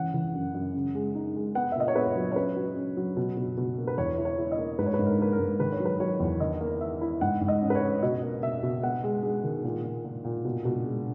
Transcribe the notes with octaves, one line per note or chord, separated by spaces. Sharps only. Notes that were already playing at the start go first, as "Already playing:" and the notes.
Already playing: E3 C#4 F#5
E3
F#2
F#2
C#3
G#3
D#4
G#3
B3 F#5
E5
A#2 D#5
C#5
B3 B4
F#3
C#5
C#4 B4
F#3
C#4
F#3
B2
B2
B2
A#3
B4
E2 C#5
E4
C#5
E4
D#5
A#3
G#2 B4
C#5
B4
G#2
A#4
A#3 B4
A#4
G#2
D#3 B4
C#5
F#3
B4
F#3 C#5
E2
D#3 D#5
A#3
A#3 E5
E4
G#2 F#5
G#2
D#5
C#4
B4
C#5
C#4
B2 D#5
A#3
B2 E5
B2
B3 F#5
G#3
G#3
D#3
A#2
A#2
A#2
A#2
B2
B2
G#3